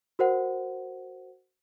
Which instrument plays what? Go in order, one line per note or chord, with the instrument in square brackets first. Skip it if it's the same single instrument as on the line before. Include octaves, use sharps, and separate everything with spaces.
[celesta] F#4 A#4 C5 F#5